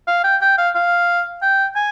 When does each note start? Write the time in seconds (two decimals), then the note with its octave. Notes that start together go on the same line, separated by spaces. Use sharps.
0.07 F5
0.24 G5
0.41 G5
0.58 F5
0.75 F5
1.42 G5
1.76 G#5